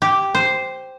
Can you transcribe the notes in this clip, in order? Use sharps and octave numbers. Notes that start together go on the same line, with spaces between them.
G4
C5